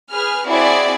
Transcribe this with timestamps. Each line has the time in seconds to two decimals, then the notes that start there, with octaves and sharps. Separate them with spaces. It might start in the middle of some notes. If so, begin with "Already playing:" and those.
0.11 G#4 B4 F6
0.48 C4 E4 F#4 G#4 D5